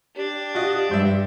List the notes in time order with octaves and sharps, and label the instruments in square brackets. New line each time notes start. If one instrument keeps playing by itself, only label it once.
[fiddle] D4 [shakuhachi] G4
[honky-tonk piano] F4 F#4 D#5
[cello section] G2 [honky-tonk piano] C5 E5